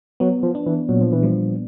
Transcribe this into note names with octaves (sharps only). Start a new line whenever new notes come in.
F#3 B3
F3
D4
E3
A#2 F#3
F3
E3
F3 G3